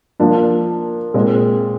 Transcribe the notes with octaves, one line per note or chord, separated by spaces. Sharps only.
F3 A#3 D4
A#2 G#3 C4